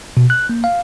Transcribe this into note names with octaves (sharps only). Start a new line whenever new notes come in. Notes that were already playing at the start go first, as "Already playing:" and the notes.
B2
F#6
A#3
F5